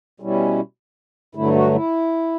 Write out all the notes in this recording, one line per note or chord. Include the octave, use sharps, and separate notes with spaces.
B2 G3 C#4 E4
G2 D3 F#3 A3 E4
F#4
E4